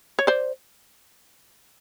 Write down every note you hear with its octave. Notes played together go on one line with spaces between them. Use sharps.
C#5
C5 D5